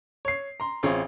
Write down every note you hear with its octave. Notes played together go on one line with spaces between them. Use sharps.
C#5 C7
A#5 C6
A1 C4 F4 G#4 C#5